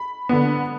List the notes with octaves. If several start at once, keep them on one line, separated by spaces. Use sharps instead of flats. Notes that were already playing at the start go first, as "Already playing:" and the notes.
Already playing: B5
D3 B3